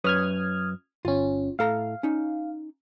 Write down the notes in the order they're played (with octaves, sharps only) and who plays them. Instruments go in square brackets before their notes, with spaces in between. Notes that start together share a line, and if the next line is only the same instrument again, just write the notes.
[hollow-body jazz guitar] F#2 B4 C#5 [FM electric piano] D#6 F6 G#6
[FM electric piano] G1 C#4 [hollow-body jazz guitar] F4
[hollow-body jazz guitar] A2 A4 A#5 [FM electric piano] F5
[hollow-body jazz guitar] C#4 D#4